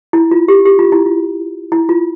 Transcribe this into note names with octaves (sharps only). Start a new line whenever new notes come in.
E4
F4
G4
G4
F4
E4
F4
E4
F4